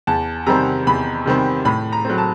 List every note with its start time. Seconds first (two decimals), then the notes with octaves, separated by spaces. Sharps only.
0.07 E2 A5
0.46 C3 D#3 G3 C4 A#5
0.87 E2 B5
1.26 C3 D#3 G3 C4
1.65 A2 B5
1.92 A#5
2.05 F#3 A3 C4
2.18 A5